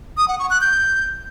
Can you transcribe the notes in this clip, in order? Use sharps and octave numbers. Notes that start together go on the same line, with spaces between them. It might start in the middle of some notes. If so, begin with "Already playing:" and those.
D#6
F#5
C#6
F#6
G6